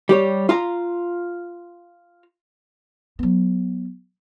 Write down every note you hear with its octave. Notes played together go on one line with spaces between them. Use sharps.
G3 G4 C#5
F4 F5 A#5
F#3 B3